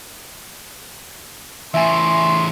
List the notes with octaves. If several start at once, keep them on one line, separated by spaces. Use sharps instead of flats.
E2 A2 E5 G#5 C6